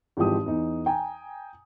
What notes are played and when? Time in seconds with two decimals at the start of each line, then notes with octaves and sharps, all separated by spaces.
0.17 G#1 E3 F3 G#3 G4 D#6
0.46 E2 D#4
0.86 G5 G#5 A#5